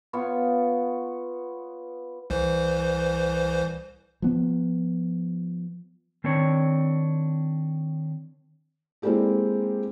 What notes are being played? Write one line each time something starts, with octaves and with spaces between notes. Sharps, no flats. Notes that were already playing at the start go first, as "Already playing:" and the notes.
B3 F4 C#5 F5
C2 E3 C5
F3 B3
D#3 C4 D4 C#5
G#3 A#3 C4 E4 G4 A4